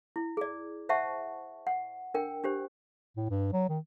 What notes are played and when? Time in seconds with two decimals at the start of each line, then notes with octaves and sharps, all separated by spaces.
0.16 E4
0.37 G#4 D5
0.89 C5 E5 F#5 A5 C#6
1.67 F#5
2.14 D4 A#4 G5
2.44 D4 G4 C5
3.17 A2
3.30 G2
3.53 F#3
3.69 D#3